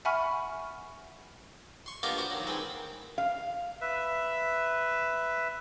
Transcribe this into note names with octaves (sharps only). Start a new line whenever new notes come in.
E5 F#5 G#5 B5 C#6 F6
C6 C#6
A#3 B3 D4 F4 G4 D#5
F#4 G4 C5
D#3 F#3
D#3 G#3 C4 B4
F5
B4 E5